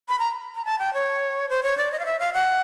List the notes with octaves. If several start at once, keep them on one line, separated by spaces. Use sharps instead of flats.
B5
A#5
A#5
A5
G5
C#5
C5
C#5
D5
D#5
F5
E5
F5
F#5